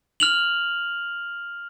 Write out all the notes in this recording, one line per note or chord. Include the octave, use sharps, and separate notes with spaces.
F6 F7 F#7